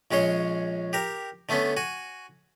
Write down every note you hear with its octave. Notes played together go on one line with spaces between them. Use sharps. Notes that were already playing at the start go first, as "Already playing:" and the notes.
A#1 G#3 C#4 C#5 C6
G4 A#4
D3 A3 B3 C#4
F#4 G#5